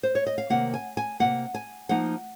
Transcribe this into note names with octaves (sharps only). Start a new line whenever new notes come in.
C5
C#5
D#5
F5
C3 D#3 A#3 F#5
G#5
G#5
C3 D#3 A#3 F#5
G#5
F3 A#3 D#4 F#5